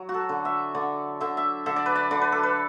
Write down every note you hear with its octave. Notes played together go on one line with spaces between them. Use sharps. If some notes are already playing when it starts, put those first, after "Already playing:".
Already playing: F#3
F#4
A4
D3
E5
D3 D5
D3 E5
E5
D3 E5
D5
B4
D5
D3 D5
B4
A4
B4